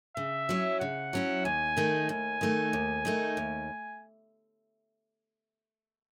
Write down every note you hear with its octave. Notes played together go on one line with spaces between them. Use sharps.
C#3 E5
F#3 C#4 E4
C#3 F#5
F#3 C#4 E4
D#2 G#5
D#3 A3 D#4
D#2 G#5
D#3 A3 D#4
D#2
D#3 A3 D#4
D#2